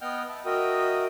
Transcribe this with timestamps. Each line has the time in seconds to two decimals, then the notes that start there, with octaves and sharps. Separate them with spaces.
0.01 B3 D#5 F#5 G5 F6 G6
0.29 E5 A5
0.45 F#4 A#4 D#5 E5 G5 D#6